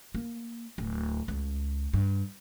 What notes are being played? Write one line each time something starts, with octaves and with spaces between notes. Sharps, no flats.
A#3
D1
C#2
G2